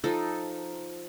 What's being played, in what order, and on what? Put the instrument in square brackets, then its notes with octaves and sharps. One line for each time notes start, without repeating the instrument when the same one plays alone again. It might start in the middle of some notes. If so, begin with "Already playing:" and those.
[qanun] F3 D#4 A4